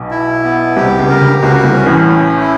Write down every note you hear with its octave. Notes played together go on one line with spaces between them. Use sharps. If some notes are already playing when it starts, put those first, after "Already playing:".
Already playing: B1 B2
E4
B3
C2 C3 G4
C#2 C#3
A#4
D2 D3
C#2 C#3 F#4
C2 C3
C#4
A1 A2
C#4
E4